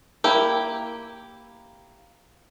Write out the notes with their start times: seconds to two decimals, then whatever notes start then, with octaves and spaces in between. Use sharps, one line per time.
0.24 A#3 E4 G4